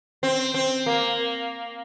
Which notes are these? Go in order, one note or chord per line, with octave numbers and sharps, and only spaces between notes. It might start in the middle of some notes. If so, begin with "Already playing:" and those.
C4
C4
A#3